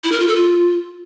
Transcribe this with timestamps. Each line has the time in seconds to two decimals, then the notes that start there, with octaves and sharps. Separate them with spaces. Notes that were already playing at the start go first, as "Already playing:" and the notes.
0.04 E4
0.12 A#4
0.20 F4
0.28 A4
0.36 F4